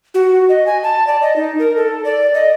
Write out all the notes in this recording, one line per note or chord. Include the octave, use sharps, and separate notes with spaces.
F#4
D#5
G#5
A5
D5
D#5
D#4
A#4
A4
D5
D#5